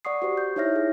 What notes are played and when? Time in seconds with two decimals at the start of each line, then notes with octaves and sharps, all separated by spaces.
0.05 D5 F#5 C#6 D#6 C7
0.22 F#4 G4 C5 C#6
0.37 G6
0.56 D#4 E4 C#5 E5 F6 A#6
0.76 G#4